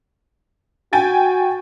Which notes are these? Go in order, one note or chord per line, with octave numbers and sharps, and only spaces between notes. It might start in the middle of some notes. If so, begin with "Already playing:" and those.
F#4 G5 G#5 A6